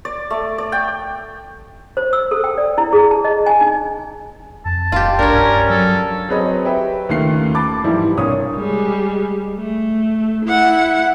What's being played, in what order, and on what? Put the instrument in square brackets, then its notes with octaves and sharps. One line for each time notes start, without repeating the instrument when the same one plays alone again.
[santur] D5
A3
D5
G5
[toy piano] C5
E6
A4
G5
D5
E4
G#4
A5
D#5
G#5
D#4
[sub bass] F2 [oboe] A5
[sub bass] D#1 [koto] F4 G4
[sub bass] B1 [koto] D4 C#5 [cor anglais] A#4
[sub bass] G2 [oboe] C#4
[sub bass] F#3 [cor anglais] A4
[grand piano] F#3 C4 G#4 B4 C#5 D#5
G4 B4 E5 G5
D#2 C#3 A3 F4 C7
A5 B5 D6 A6
G#2 E3 F3 G3 E4
C2 G2 A#2 C#5 D#6
[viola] G3 G#3
A3
E4 F#5